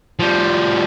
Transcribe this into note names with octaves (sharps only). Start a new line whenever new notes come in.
F3 G3